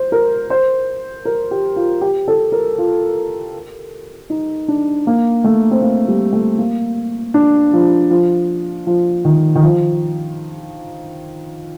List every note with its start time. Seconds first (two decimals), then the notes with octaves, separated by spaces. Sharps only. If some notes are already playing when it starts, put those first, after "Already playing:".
Already playing: C5
0.12 A#4
0.50 C5
1.25 A#4
1.51 G4
1.76 F4
2.01 G4
2.28 A4
2.52 A#4
2.78 F4
4.30 D#4
4.68 D4
5.07 A#3
5.44 A3
5.71 C4
5.82 A#3
6.08 G3
6.33 A3
6.59 A#3
7.34 D4
7.73 F3
8.11 F3
8.87 F3
9.25 D#3
9.55 D#3
9.63 F3